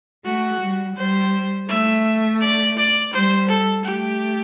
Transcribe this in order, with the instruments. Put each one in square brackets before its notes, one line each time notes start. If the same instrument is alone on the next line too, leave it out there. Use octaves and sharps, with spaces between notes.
[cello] A3 [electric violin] F#4
[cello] G3
[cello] G3 [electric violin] C5
[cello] A3 [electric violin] E5
[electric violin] D5
D5
[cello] G3 [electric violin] C5
[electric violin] A4
[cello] A3 [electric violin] G4